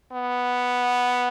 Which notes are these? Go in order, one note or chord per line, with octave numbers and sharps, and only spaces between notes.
B3